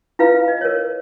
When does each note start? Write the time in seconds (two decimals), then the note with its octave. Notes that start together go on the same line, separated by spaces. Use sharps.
0.19 E4 F4 B4 F5
0.48 D#5
0.61 A#4 C#5